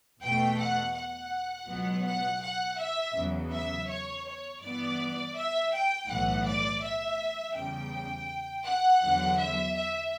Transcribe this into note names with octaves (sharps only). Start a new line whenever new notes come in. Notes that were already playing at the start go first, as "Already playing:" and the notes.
E2 B2 A3 G5
F#5
F#5
C#2 B2 F#3 B3
F#5
F#5
E5
E2 C#3 F#3
E5
C#5
C#5
G2 E3 B3 D5
E5
G5
B1 A2 E3 F#5
D5
E5
E2 C#3 G3 G5
F#5
E2 D3 F#3
E5
E5